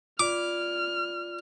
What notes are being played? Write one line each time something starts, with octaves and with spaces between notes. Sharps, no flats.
F4 D5 D6 F6